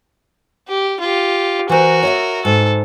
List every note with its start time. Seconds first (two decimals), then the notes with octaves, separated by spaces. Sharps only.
0.68 G4
1.00 F4 G4
1.69 E3 F#4 A#4 C5
2.03 C#5 D#5 E5
2.45 G#2 A4